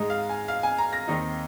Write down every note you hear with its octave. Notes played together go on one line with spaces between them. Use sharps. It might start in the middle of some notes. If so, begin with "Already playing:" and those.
Already playing: G#2 G#3 D#4 D#5
F5
G#5
F5
G#5
A#5
A#6
D#2 D#3 C4 D#4